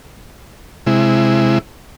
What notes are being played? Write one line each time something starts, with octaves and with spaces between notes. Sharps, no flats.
C3 G#3 E4